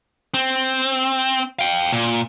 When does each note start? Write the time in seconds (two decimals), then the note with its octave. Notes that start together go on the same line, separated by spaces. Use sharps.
0.34 C4
1.59 F5 G5
1.93 A#2